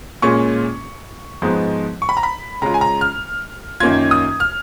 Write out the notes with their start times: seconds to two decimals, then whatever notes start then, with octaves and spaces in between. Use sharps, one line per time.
0.22 A#2 G#3 C#4 F4 C#6
1.42 G#2 F3 G#3 B3 D#4
2.02 C#6
2.09 B5
2.17 A#5
2.23 B5
2.62 C#3 G#3 C#4 F4 A#5
2.74 G#5
2.81 A#5
3.01 F6
3.80 F#2 D#3 A#3 C#4 F4 G#6
4.11 D#6
4.40 F6